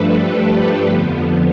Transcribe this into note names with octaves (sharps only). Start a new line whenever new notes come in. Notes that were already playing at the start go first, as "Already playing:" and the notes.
Already playing: G2 F3 A3 D4 A4 B4
G4
F2 D3 F3 B3